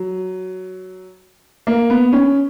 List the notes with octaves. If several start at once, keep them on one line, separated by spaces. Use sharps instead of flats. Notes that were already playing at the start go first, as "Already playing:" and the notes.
Already playing: F#3
A#3
B3
C#4